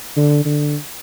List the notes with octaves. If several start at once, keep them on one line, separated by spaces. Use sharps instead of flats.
D3
D3